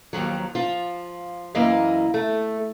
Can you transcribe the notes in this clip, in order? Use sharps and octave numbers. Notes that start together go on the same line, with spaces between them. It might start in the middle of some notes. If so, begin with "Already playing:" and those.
D#2 D#3 F3 F#3
F3 F4
F#2 E3 A#3 E4 D#5 F5
A3